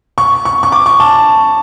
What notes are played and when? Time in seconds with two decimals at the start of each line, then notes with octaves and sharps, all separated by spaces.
0.18 C#6
0.45 C#6
0.63 C#6
0.72 D6
0.86 C#6
1.00 A5